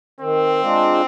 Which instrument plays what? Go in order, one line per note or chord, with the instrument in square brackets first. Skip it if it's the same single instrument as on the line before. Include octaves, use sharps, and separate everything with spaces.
[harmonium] D#3 [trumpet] C4
[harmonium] G#3 D4 F4